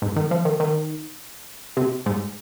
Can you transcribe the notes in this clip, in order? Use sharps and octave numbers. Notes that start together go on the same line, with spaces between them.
G#2
D#3
F3
D#3
D#3
C3
G#2